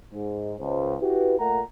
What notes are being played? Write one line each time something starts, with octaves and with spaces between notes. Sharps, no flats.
G#2
C#2 C5
E4 F#4 G4 B4
A#2 A3 A#4 F#5 A#5